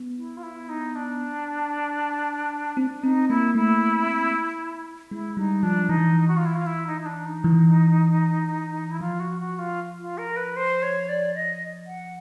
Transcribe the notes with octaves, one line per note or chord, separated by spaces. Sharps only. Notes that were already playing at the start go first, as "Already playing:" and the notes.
Already playing: B3
E4
F4
E4
D#4
D4
C4 D4
C4 D#4
A#3 E4
A3 E4
G#3 E4
G3 D#4
F3 D4
E3 D#4
F#4
F4
E4
F4
E4
D#4
D#4
D4
D#4
E3
E4
F3 F4
F#4
F#4
F4
F4
A#4
B4
C5
C#5
D5
D#5
F#5